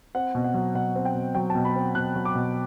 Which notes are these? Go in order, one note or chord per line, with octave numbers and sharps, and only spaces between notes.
C4 F#5
B2
F#5
F#3
B2 F#5
C4
G5
B2
F#3 G5
B2 A5
B5
C4
B2 F#6
F#3
D6
B2